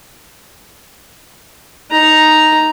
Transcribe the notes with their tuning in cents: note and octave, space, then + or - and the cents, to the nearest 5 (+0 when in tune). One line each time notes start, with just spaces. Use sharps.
D#4 +0 A#5 +0